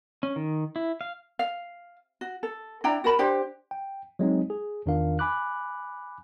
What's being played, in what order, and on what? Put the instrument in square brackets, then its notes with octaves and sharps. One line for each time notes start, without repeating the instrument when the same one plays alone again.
[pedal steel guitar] C#4
D#3
E4
F5
[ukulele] F5
F#4
A4
D4 E4 G5 A#5
F#4 A#4 A5 B5
D4 G4 C5 G5
[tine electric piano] G5
F#3 G#3 C4 D#4
G#4
E2 D#3 D4 F4 A#4 F5
G#5 B5 D6 F#6